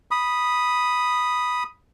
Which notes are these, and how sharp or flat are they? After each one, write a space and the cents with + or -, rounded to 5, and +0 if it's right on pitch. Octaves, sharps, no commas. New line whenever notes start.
B5 -5 D#6 +0